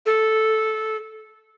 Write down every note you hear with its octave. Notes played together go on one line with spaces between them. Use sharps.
A4